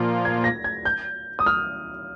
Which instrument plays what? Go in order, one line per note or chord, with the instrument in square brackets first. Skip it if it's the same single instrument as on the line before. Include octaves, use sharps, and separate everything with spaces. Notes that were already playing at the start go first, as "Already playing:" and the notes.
Already playing: [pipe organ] A#2 F3 A#3 F4
[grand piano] G#6
A#6
G#6
G6
D#6
F6